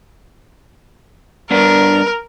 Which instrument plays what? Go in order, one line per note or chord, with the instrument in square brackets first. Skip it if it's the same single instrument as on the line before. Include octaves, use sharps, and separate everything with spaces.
[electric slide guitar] G2 B3 D4 [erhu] A#4